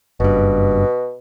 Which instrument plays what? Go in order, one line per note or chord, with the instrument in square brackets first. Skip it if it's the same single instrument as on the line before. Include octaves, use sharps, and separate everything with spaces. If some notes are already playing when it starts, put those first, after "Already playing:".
[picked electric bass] F#1 G2 [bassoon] B2